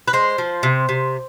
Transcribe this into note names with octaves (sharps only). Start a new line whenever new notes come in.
B4
G#3 C5
F3
C3
C3